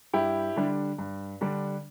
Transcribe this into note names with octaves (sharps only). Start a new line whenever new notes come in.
G2 E4 G4
D3 G3 D4
G2
D3 G3 D4